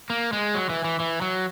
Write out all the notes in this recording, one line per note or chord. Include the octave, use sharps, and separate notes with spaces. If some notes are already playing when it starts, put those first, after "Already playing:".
A#3
G#3
F#3
E3
E3
E3
F#3